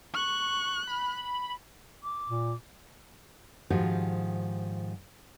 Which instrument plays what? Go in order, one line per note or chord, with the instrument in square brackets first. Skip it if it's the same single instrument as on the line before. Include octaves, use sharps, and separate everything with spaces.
[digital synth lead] C#6 [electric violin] F#6
[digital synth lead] B5
[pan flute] D6
[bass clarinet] A#2
[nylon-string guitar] G#2 D#3 F3 F#4 G4 C5